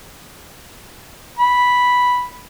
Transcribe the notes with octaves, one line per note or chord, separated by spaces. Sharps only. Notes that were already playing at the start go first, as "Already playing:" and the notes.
B5